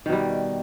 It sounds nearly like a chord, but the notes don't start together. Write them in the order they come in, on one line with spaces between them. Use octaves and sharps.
D#3 B2 G3